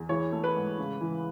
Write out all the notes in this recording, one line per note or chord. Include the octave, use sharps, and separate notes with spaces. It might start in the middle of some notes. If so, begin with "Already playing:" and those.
Already playing: E2
E3 C#5
A3
B4
G#2
C#3
E3